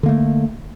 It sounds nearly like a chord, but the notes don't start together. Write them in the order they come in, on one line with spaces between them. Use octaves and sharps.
D3 A#3 A3